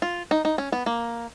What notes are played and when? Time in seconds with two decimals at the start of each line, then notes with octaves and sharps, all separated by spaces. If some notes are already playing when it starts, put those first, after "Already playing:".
0.02 F4
0.31 D#4
0.45 D#4
0.58 C#4
0.72 B3
0.86 A#3